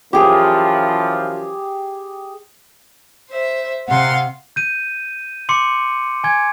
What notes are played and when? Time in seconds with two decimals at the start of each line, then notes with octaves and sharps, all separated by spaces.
0.13 F#2 E3 F3 G4 G#4
3.31 C5 E5
3.88 C3 F5 F#5 C6
4.56 G6 D#7
5.49 C6 D6 C#7
6.24 G#5 G#6